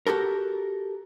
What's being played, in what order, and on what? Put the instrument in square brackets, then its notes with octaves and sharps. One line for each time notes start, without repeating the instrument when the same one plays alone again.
[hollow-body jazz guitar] F#4 G4 A4 A#4